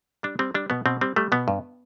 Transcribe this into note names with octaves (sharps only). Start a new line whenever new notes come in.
G3 D4
G3 C4
G3 D4
B2 B3
B2 C4
G3 C4
G3 A3
B2 B3
G2